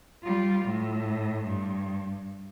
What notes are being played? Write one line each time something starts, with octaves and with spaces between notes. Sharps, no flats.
G3 F4
A2
G2